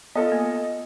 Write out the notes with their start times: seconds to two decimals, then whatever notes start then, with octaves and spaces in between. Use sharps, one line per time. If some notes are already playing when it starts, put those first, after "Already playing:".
0.15 B3 F4 A4 D#5
0.32 A#3